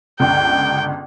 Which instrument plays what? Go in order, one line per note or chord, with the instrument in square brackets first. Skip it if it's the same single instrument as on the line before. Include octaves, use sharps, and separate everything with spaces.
[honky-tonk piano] G1 C#2 [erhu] G5